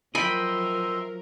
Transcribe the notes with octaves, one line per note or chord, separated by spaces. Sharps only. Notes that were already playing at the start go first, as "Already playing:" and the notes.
F3 F#3 A#4 D#5 E5 G5 B5 C6